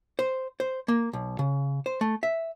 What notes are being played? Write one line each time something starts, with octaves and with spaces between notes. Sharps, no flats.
C5
C5
A#3
B1
C#3
C5
A3
E5